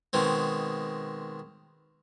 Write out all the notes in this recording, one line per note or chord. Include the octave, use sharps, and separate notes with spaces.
B2 D#3 G#3 C4